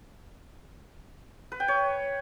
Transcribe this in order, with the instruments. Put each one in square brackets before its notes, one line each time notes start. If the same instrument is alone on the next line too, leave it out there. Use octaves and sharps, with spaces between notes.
[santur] B4
G5
C#5